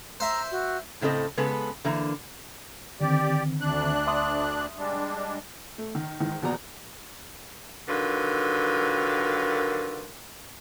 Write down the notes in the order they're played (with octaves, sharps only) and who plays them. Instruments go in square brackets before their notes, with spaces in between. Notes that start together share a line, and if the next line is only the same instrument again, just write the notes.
[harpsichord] C5 E5 [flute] A#5
[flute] F#4
[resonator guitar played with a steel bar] A2 C#3 C4 A4 D#5
C#3 G#3 B3 A4 B4
D3 E3 A#3
[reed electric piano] D3 D#3 C4 [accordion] G4 D5
[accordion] D2 D4 F#6
[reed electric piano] E5 C6 D#6
[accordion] G3 G#3 D4
[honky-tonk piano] A3
D#3
G#2 D#3 E3
A#1 E2 B2 F#4 D5 A#5
[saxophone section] D3 D#3 F#3 F4 A#4 B4